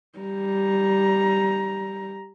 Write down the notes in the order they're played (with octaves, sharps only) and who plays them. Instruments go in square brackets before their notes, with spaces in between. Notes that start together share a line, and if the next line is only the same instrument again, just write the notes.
[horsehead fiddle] G3 A#5